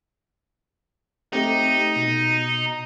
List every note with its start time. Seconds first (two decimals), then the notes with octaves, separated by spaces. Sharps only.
1.33 A3 C4 D#4 G4
1.96 B2